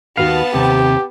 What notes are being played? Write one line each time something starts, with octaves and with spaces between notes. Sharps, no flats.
D#2 D#3 B3 F#4 F5 A5
D#2 C3 C4 G4